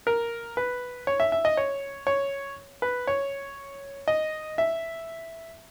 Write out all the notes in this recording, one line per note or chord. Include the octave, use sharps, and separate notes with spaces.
A#4
B4
C#5
E5
E5
D#5
C#5
C#5
B4
C#5
D#5
E5